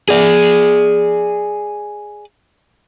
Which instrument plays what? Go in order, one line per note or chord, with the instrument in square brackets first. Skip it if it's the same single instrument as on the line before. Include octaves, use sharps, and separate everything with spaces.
[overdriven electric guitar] G#4 D5